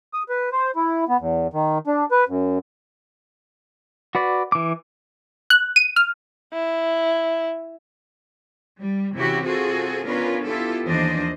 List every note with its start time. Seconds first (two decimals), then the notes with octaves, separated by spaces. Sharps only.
0.14 D#6
0.29 B4
0.52 C5
0.76 E4
1.08 B3
1.20 E2
1.53 D#3
1.87 D4
2.11 B4
2.28 F#2
4.15 F#4 B4 D5
4.52 E3 D6
5.50 F#6
5.76 D#7
5.96 F6
6.53 E4
8.80 G3
9.13 C3 E3 C#4 E4 F#4 G4
9.45 C4 F4 F#4 G#4 A4
10.04 B3 C#4 D4 F4 A#4 B4
10.45 B3 E4 F4 G4 A4
10.86 D#2 E3 F3 D4 C5 D#5